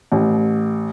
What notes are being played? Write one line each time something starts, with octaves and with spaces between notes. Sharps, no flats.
A1